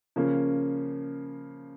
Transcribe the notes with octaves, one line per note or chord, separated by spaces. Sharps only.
C#3 F3 A#3 C#4